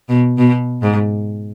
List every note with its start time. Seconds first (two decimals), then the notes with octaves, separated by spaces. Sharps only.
0.09 B2
0.38 B2
0.82 G#2